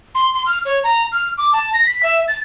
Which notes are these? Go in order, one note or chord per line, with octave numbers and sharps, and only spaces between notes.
C6
C6
F6
C#5
A#5
F6
D6
A5
A#6
B6
E5
A6